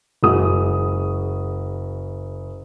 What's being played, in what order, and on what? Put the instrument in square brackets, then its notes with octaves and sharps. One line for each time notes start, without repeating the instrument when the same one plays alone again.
[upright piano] F#1 G#3 F#4 D#6